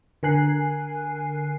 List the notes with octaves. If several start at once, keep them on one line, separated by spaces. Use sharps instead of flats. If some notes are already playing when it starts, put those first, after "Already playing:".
D3 A#4 G#5 F#6 C7